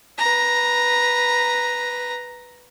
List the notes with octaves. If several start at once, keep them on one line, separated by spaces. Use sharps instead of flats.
B4 A#5